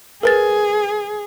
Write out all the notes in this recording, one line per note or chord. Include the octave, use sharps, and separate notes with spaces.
G#4 A#4 B4 A6